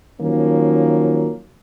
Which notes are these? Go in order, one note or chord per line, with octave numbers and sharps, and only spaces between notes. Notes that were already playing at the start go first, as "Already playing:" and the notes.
D#3 F3 F#3 A#3 C#4